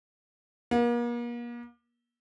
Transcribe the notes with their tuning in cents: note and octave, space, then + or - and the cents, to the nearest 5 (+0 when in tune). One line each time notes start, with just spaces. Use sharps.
A#3 +40